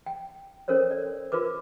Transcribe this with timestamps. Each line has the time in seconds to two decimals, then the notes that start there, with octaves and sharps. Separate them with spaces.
0.06 G5
0.68 C#4 A4 A#4 C5 C#5
0.91 D5
1.32 F4 A#4 B4 D6